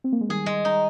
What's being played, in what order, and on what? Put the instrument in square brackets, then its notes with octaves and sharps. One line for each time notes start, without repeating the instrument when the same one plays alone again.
[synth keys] C4
A#3
G#3
[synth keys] D#3 G3 [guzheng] G#4
[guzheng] G#3
D#4